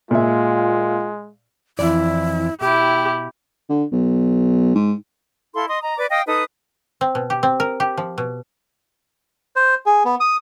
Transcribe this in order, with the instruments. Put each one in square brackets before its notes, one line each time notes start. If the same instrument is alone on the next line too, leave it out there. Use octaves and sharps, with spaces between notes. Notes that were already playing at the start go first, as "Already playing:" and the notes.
[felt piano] A#2 E5 [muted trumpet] G#3 [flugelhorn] F4
[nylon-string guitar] F2 E3 D5 [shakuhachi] E4
[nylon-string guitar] B2 [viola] E4 G4 [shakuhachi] G5
[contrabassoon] D3
B1
G#2
[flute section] E4 A4 F5 C6
D#5 C6 D#6
D#5 A#5
B4 D5 D6
D#5 F5 G5 D#6
D#4 A4 B4 D#6
[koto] C4
B2
G4
C4
A#4
G4
F3
B2
[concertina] C5
G#4
B3
D#6